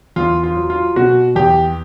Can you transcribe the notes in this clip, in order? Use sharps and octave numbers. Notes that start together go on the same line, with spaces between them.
E2 F4
F4
F#3
F4
B2 F#4
E2 G4